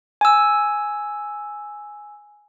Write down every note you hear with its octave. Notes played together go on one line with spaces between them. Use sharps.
G#5 E6